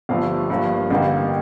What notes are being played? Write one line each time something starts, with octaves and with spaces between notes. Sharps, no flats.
G1 G2 F3 A3 F5
G2 F3 A#3
A1 G2 D3 G3 A#3 F5